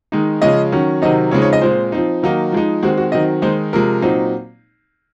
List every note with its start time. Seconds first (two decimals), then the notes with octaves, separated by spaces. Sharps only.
0.12 D#3 G#3 D#4
0.42 C#3 F3 G#3 C#4 D#5
0.72 D#3 F#3 C#4
1.02 C3 D#3 F#3 C4 D#4 D#5
1.31 C#3 F3 G#3 C4 D#4 C#5
1.42 C#5
1.53 D#5
1.62 A#2 G#3 C4 C5
1.92 F3 C4 D#4
2.23 D#3 F#3 A#3 D#4
2.52 F3 G#3 D#4
2.83 D#3 G#3 C4 F#4
2.98 F#4
3.12 D#3 F#3 C4 D#5
3.42 D#3 G#3 D#4 C5
3.73 C3 F3 G#3 A#4
4.02 A#2 F#3 C4 D#4